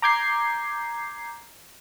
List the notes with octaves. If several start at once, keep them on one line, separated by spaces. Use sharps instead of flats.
A#5 D6 G6 G#6 C7